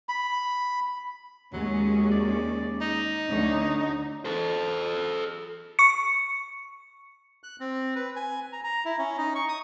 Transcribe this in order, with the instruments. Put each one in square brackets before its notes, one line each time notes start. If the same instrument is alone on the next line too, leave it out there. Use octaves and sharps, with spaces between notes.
[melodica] B5
[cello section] D#2 G#3 C#4 [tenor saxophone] F#3
[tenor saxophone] D5
D#4
[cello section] D2 D3 C#4
[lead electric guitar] A4 C5
[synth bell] C#6 C#7
[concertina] F#6
C4
B4
G#5
A#5
A#5
E4
C#4
D#4
C#6
D#6